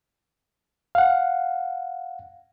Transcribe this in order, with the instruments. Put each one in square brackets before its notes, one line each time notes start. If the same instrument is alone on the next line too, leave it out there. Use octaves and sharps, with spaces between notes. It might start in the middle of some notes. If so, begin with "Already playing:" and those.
[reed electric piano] F5 F#5